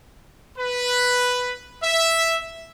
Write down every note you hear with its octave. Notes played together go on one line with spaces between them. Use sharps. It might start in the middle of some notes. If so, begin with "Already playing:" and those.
B4
E5